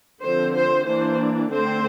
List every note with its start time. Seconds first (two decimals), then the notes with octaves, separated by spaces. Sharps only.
0.22 D3 F3 C4 C5
0.54 C5
0.86 E3 A#3 D4 C5
1.50 D3 A3 C4 C5